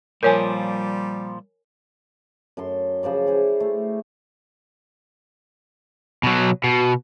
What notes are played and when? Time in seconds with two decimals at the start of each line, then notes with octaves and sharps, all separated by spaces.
0.23 A#2 F3 G3 A#4 C#5 G#5
2.57 F#2 A4 C6
3.03 C#3 F3 C5 D5
3.26 E4 G#4 C5
3.60 A3
6.23 B2 F#3
6.64 B2